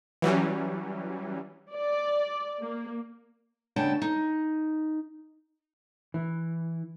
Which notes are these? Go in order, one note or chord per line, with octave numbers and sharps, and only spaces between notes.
E3 F#3 G3 C#4
D5
A#3
D2 C#3 C#4 G5 A5
D#4
E3